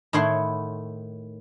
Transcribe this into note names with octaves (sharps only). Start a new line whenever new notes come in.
A2 D#3 E4 C#5 F#5 C6